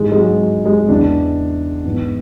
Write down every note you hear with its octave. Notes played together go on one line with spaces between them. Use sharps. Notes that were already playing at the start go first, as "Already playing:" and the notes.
Already playing: G#2 E3 G#3
G#3
F#3
G#3
E2 C#3 E3 D4
G#2 E3 B3